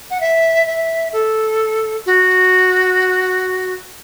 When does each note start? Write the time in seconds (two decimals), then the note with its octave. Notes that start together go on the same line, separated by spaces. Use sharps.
0.11 F#5
0.21 E5
0.67 E5
1.13 A4
2.06 F#4